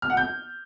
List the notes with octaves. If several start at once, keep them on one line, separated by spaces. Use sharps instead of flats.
F6
F#5
G6